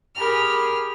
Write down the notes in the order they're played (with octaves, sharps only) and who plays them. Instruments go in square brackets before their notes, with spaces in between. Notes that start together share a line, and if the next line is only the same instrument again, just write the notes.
[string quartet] G4 G#4 A#4 B5 F6